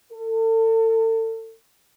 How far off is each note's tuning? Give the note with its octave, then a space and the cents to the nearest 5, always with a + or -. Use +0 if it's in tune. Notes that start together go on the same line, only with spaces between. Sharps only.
A4 +35